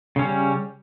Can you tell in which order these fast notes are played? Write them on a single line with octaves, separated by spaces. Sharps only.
C#3 C#4 G3